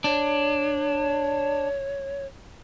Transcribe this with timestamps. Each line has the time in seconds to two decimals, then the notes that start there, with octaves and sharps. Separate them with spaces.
0.04 D4 C#5